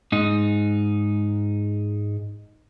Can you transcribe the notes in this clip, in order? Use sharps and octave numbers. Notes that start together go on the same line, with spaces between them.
G#2 D#4